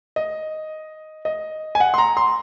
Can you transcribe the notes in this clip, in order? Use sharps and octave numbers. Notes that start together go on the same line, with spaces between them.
D#5
D#5
G#5
F#5
C6
A#5
C6